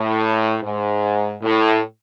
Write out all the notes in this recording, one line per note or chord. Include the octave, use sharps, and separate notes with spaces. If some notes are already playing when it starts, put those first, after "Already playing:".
Already playing: A2
G#2
A2